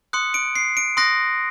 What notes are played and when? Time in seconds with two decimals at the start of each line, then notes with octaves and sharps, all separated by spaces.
0.13 C6 D#6 F#6 C#7
0.34 D7
0.56 C7
0.77 D7
0.97 C6 D#6 F#6 A#6